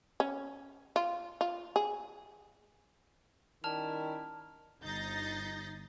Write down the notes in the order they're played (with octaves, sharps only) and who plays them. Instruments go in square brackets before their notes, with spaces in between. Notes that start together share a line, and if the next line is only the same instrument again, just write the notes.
[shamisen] C#4
F4
F4
G#4
[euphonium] D#3 [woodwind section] G3 C#4 E4 [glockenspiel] A5 F6 F7
[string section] G1 D#4 G6 A6 A#6 C7